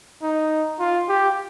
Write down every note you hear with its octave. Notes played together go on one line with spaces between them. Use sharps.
D#4
F4
G4